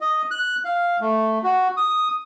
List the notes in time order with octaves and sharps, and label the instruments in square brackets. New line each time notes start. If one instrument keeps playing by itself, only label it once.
[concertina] D#5
F#6
F5
A3
F#4
D#6